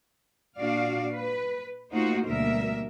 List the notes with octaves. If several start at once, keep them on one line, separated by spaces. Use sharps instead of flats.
A#2 D4 F#4 D5 F5
B4
A3 A#3 D#4 F4 F#4 C5
D2 B2 G3 A#3 A#4 E5